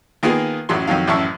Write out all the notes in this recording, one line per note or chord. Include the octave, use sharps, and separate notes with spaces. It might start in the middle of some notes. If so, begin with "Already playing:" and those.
D#3 A#3 B3 F4 G#4
A1 F#2 F#3 C6
F2 D#3 F#3 F5
A1 F#2 E4 A5 C#6 E6